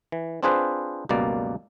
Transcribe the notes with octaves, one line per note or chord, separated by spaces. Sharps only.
E3
C4 D4 F4 G#4 B4 C5
C#2 F#2 B2 G3 A#3 D5